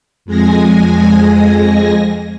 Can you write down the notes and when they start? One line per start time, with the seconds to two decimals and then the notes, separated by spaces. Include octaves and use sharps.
0.25 F2 G#3 G#5 A#6